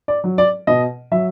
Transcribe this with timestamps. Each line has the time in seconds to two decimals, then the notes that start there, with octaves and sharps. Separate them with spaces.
0.08 D5
0.24 F#3
0.38 D5
0.67 B2 D#5
1.11 F#3 E5